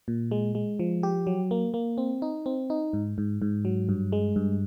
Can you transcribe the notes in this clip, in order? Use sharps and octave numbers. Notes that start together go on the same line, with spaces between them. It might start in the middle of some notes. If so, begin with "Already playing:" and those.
A#2
G#3
G#3
F3
G4
F#3
A#3
A#3
C4
D#4
C4
D#4
G#2
G#2
G#2
F#3
G2
G#3
G2